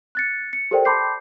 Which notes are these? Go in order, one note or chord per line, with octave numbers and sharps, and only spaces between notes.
F#6 A6 C#7
C#7
G4 A4 A#4 C5 D5 G5
A5 B5 C6 D6 G6 C7